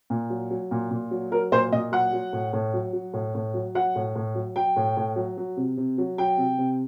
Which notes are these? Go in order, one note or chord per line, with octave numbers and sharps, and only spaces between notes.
A#2
F#3
F#3
A#2
A#2
F#3
F#3 A#4
A#2 C5
A#2 D#5
F#3 F#5
F#3
A2
A2
F#3
F#3
A2
A2
F#3
F#3 F#5
A2
A2
F#3
F#3 G5
A2
A2
F#3
F#3
C3
C3
F#3
F#3 G5
C3
C3